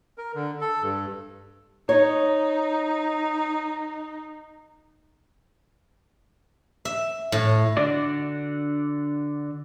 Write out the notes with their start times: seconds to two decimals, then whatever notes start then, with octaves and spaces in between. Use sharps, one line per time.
0.18 A#4
0.35 D3
0.61 A4
0.83 G2
1.89 D#4 C#5
6.85 E5
7.32 A2
7.77 D3 D4 F#4 D5